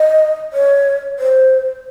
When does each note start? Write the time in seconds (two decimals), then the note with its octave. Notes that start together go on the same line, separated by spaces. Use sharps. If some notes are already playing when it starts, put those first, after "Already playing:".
Already playing: D#5
0.53 C#5
1.19 C5